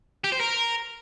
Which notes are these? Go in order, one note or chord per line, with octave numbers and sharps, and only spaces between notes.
G4
C5
A#4